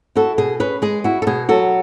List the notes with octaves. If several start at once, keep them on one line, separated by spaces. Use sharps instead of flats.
E4 F#4 A4
B2 G#4
C#4 G#4 B4
G#3 G#4
E4 F#4
A4
B2 G#4
F#3 F#4 A4